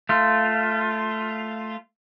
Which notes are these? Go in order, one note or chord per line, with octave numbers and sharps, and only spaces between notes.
A3 F4